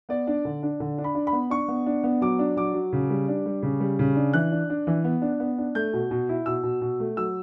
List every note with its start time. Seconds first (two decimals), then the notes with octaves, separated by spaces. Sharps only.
0.09 B3 D5
0.27 D4
0.45 D3
0.63 D4
0.80 D3
0.98 D4
1.04 B5
1.15 D4
1.27 B5
1.33 B3
1.50 D4 C#6
1.68 B3
1.86 D4
2.04 B3
2.21 F#3 D6
2.39 D4
2.56 F#3 D6
2.74 F#3
2.93 C#3
3.10 G3
3.28 D4
3.46 G3
3.63 C#3
3.80 G3
3.99 C#3
4.16 D4
4.33 E3 F#6
4.52 D4
4.70 D4
4.87 E3
5.04 B3
5.22 D4
5.40 B3
5.58 D4
5.75 A3 G6
5.93 B2
6.11 B2
6.29 E4
6.46 B2 E6
6.63 B2
6.81 B2
7.00 A3
7.17 F#3 E6